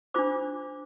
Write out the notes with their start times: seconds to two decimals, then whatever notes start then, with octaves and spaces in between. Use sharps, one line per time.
0.14 D4 F4 C5 D6